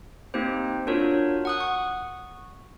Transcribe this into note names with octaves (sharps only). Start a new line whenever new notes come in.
A#3 C4 D#4 G4 C5
D4 F4 F#4 A#4 C#5
F#5 D#6 F#6
C#6